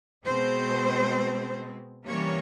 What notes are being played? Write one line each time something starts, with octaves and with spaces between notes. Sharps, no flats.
B2 G#3 C4 C5
C3 E3 G3 A#3 C#4 C#5